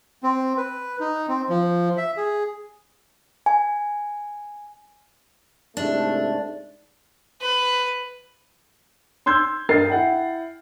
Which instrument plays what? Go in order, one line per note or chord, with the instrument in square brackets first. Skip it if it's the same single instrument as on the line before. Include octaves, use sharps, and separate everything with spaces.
[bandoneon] C4
B4
D#4
C4
F3
E5
G#4
[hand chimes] G#5
[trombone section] C2 G#2 A3 [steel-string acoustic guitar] D4
[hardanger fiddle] B4
[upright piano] C6 E6 G6 G#6
G2 A#4 D#5 A6 C7
E4 F#5 G5